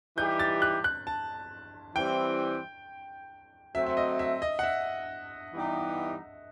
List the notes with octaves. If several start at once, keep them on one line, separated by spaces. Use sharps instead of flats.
E3 G3 D#4 G4 G6
A6
F#6
F#6
A5
E3 G3 C4 E4 G5
F#3 A3 C4 E5
E5
D#5
E5
D#5
F#5
E5
E3 G3 B3 D#4 G4